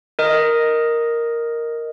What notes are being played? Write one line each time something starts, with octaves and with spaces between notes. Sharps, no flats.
A#4 D#5